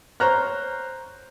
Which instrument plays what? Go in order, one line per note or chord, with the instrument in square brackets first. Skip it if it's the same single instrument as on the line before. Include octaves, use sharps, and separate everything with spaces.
[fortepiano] C5 C#5 A#5 F6 F#6